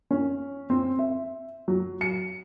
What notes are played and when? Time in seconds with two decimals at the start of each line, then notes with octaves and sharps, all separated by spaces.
0.11 C#4
0.70 C4
0.99 E5
1.68 F#3
2.01 C#7